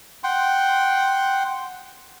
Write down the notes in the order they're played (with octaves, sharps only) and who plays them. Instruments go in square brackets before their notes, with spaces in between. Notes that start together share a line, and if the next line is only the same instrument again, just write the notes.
[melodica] F#5 G5 C6